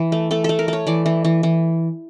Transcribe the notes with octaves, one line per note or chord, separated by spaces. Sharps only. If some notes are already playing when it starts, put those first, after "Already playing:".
Already playing: E3
A3
A3 A4
A3 A4
A#4
A3 C#5
E3 D5
E3
E3
E3